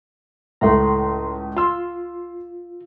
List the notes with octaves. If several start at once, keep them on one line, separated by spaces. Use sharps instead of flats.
C#2 A2 A3 A#5 C6
F4 C6 E6